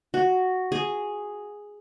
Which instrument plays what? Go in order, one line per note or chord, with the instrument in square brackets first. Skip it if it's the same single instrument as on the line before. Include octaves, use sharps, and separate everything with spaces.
[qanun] F#4
G#4